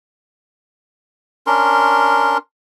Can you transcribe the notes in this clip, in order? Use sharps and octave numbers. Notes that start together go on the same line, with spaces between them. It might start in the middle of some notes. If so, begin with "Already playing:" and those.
C#4 D4 A#4 C6